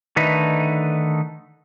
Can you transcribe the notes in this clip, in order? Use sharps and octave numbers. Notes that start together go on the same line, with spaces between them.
D3 D#3 A3 D#4 B4